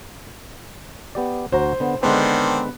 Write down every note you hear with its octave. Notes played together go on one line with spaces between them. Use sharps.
B3 G4 D5
D2 F#4 C5 A#5
D3 B3
D3 D#3 G#3 B3 C4 D4 C5